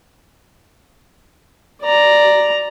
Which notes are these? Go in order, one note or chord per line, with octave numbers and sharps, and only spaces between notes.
D5 A#5